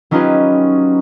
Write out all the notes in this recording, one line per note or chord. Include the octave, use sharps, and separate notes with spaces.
F#3 C#4 D#4 F4 G4 B4